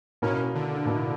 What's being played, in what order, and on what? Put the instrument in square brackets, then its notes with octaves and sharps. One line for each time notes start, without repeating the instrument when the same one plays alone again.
[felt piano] B2 A#3 E4 [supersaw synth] C#4
[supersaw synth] D3
[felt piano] B2 A#3 E4